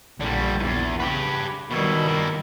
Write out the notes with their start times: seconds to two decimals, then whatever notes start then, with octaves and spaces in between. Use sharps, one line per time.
0.21 A#1 D3 G3
0.60 E2 G#2
1.00 C#3 G4 B4
1.71 B2 D#3 G3 E4
2.07 A#3 E4